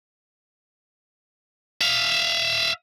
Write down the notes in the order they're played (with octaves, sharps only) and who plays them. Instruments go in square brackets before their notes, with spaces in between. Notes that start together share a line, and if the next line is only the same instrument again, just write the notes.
[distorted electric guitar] E5 F5